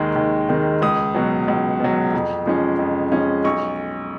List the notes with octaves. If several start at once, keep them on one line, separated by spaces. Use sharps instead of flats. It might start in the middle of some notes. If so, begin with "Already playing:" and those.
Already playing: D#2 D#3 G#3
D#2
D#3 G#3
C#2 D#6
B2 F#3
C#2
B2 F#3
F2
F3 G#3 C#4
F2
F3 G#3 C#4
B1 C#6